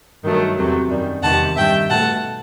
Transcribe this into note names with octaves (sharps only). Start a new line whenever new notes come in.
G2 D#3 F#3 A3
E2 C3 F#3 A3
F#2 D#3 G3
E2 C3 D#3 G3 F#5 A5
G2 D#3 G3 E5 G5
B2 A3 F#5 A5